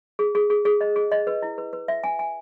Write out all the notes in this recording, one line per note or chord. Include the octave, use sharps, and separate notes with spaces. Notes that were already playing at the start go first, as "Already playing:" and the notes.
G#4
G#4
G#4
G#4
D#5
G#4
D#5
B4
E4
B4
B4
E5
G#5
G#5